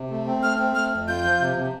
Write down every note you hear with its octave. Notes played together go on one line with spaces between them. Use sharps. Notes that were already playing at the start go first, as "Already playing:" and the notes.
Already playing: C3
A3
C4
A3 F6
C4
A3 F6
F2
F4 G6
F3
C3
C3